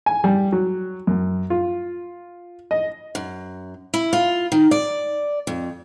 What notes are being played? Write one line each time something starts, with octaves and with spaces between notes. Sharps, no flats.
G#5
G3
F#3
F#2
F4
D#5
F#2
E4
F4
D#3
D5
F2